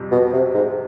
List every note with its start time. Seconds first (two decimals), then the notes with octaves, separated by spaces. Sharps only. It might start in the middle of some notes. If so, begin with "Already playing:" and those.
Already playing: F2 C3 G3
0.12 B2
0.33 C3
0.54 G#2